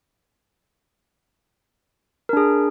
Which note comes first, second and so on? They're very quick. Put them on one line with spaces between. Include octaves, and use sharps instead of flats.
A#4 D4 G#4